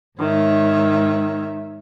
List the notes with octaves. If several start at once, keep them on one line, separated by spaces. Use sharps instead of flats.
G#2 D#3 C#5 E5